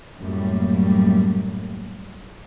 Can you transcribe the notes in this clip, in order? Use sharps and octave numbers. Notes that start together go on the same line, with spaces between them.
F#2 A2 G3 A#3